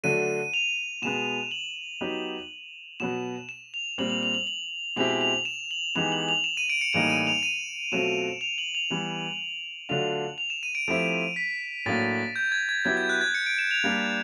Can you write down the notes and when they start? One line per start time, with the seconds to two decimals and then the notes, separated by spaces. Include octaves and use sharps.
0.04 D3 F#3 A3 D4 D#7
0.54 F7
1.02 B2 G#3 B3 E7
1.51 F#7
2.01 F#3 B3 D#4 G4
3.00 B2 F#3 B3 E7
3.49 E7
3.74 F7
3.98 A#2 G3 C4 F#7
4.10 F7
4.23 F7
4.34 F#7
4.47 F#7
4.96 B2 G#3 C4 E4 G4 F7
5.21 F7
5.45 E7
5.71 F#7
5.95 E3 G#3 B3 D#4 G4 F7
6.12 F#7
6.29 F7
6.44 E7
6.57 D#7
6.70 D7
6.81 C#7
6.93 A2 E3 G3 A#3 D#4 D7
7.10 D#7
7.27 F7
7.43 D#7
7.92 B2 F#3 A3 C4 F4 E7
8.41 F7
8.58 F#7
8.75 F7
8.90 E3 G3 B3
9.89 D3 F#3 A3 D4 F4 F7
10.38 F7
10.50 E7
10.63 D#7
10.75 D7
10.88 F3 A3 C4 E4 G4 D7
11.36 B6
11.86 A2 F#3 A#3 D4 A6
12.36 G6
12.52 G#6
12.69 G#6
12.85 F#3 B3 E4 G4 G#6
12.97 G6
13.09 F#6
13.21 G#6
13.35 C#7
13.46 D7
13.58 E7
13.71 F7
13.84 G3 A#3 D4 G4